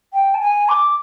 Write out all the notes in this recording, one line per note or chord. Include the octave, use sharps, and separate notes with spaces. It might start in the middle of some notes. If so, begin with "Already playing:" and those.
G5
A5
G#5
D6